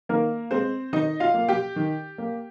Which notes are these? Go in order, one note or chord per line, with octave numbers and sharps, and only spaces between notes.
D#3 A#3 A#4
G#3 C4 C5
D#3 D#4 D#5
F4 F5
A#3
G4 G5
D#3
A#3